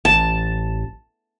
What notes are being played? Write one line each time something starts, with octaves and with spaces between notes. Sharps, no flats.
A1 A5